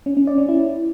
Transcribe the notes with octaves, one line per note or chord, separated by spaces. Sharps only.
C#4
C#4
D5
C#4
E4